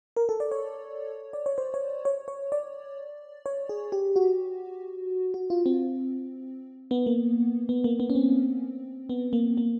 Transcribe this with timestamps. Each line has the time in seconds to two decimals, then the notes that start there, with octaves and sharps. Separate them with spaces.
0.17 A#4
0.29 A4
0.40 D5
0.51 C#5
1.33 D5
1.46 C#5
1.58 C5
1.74 C#5
2.05 C#5
2.28 C#5
2.52 D5
3.46 C#5
3.69 G#4
3.92 G4
4.16 F#4
5.34 F#4
5.50 F4
5.66 C4
6.91 B3
7.06 A#3
7.69 B3
7.84 A#3
8.00 B3
8.10 C#4
8.15 C4
9.09 B3
9.33 A#3
9.57 A#3